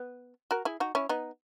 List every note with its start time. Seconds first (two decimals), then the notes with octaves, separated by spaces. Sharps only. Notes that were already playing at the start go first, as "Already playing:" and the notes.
Already playing: B3
0.51 F#4 A#4
0.65 E4 G#4
0.80 D#4 F#4
0.95 C#4 E4
1.09 B3 D#4